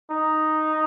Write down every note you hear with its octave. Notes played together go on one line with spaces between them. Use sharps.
D#4